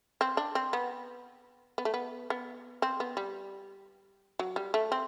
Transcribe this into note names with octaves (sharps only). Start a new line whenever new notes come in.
C4
D4
C4
B3
B3
A3
B3
B3
C4
B3
G3
F#3
G3
A3
C4